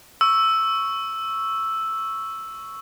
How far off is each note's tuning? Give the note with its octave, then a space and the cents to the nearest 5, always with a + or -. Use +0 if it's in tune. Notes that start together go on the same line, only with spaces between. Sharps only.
C#6 +0 E6 +0